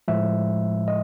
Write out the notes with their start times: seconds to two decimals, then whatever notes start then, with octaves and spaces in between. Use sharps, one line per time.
0.08 A2 F3 G#3 E5
0.88 D#5